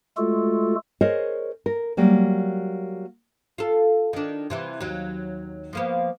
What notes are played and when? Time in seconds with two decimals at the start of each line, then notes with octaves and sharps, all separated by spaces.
0.17 G#3 A3 F4 F#4 A4
1.01 G#4 A#4 C5 C#5 D#5
1.66 A#4
1.97 F#3 G3 A#3
3.58 F4 A4
4.13 D#3 D4
4.50 C3 E3 E4
4.80 D#2 F#3
5.73 F3 A#3 B3